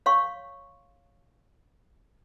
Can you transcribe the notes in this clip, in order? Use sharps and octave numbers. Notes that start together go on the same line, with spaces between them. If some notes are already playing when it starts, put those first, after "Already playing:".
C#5 F5 C6 C#6